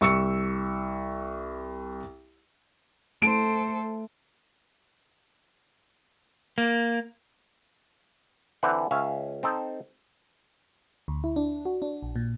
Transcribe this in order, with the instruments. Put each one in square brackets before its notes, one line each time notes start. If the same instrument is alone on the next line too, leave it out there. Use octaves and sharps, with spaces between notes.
[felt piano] C2 C#6 E6 C#7
[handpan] A3 [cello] A4 C5 [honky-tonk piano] D7
[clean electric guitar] A#3
[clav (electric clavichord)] D3 E3 C4 F#5
C#2 C#4 E5 F5
C4 D#4 A4
[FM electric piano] D2
E4
D4
F#4
D4
A#1
A#2